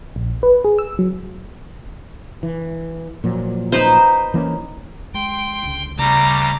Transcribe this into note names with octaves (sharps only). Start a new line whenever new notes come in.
A#1
B4
G#4
E6
F#3
E3
A#2 F3 F#3
D#4 B4 C5
E3 A#3 C#4
G#3 G5 C6
C#2 D3
D2 C#3 G3 A#5 D6